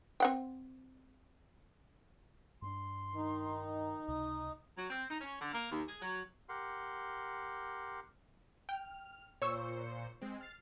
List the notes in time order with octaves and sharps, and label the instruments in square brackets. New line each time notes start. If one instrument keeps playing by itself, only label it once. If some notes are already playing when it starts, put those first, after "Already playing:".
[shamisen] C4 F#5 G5
[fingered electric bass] G2 C4 D4 [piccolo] C6
[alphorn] D#3 [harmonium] D#4
[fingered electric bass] C#2 C3 [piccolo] D#6
[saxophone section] F#3
C4
D#4
C#4
D3
A#3
D#2
G#4
F#3
[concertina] G4 A#4 F#5 C6
[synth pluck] G5 [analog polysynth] F6
[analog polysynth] A#2 C5 C#7 [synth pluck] C#5 C#6 E6
[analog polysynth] G#3 C4
F6 A6 C7